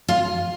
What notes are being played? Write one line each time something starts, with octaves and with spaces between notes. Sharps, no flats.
F4